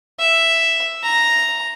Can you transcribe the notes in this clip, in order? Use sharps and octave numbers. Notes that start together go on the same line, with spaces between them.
E5
A#5